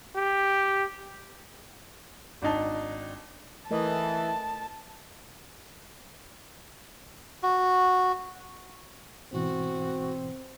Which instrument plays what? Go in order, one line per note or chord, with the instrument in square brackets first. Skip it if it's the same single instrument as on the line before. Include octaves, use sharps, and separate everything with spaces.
[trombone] G4
[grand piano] G#1 D4 D#4 A5
[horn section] E3 [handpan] A3 A#4 D#5 [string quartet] A5
[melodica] F#4
[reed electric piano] G#2 B2 E3 [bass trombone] C4 [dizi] F#4